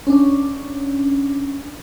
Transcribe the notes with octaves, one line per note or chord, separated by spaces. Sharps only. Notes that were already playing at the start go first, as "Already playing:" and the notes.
C#4 D4